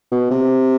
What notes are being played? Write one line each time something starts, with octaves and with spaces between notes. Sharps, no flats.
B2
C3